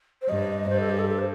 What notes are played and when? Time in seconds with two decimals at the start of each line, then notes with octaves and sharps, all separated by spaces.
0.22 C5
0.28 G2 D#5
0.69 G2 C5
0.80 A4
0.89 G4
0.99 A4
1.09 A4
1.19 C5